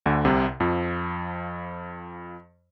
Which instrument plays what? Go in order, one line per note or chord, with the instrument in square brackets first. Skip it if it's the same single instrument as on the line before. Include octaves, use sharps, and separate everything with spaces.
[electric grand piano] D2 D3
C2 C3
F2 F3